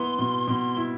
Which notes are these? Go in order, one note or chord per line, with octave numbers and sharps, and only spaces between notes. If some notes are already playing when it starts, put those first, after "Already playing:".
Already playing: B3 E4 C6
B2
B2
E4